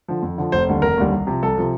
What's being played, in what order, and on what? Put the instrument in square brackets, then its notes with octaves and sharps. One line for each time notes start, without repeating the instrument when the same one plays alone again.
[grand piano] D3 F3
F2
D3 F3
F1 C5
D#2 D3 G3
F1 A#4
D#2 D3 G3
C2
C3 F3
C2 A4
C3 F3